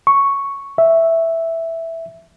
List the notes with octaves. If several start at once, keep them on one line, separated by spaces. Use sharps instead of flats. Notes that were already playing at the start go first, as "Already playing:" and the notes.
C#6
E5